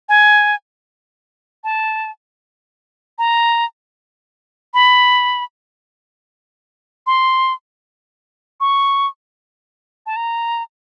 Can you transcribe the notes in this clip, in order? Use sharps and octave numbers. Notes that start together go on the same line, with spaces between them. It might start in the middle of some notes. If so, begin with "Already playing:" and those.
G#5
A5
A#5
B5
C6
C#6
A5
A#5